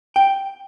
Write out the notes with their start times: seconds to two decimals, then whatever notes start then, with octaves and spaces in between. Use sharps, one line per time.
0.16 G5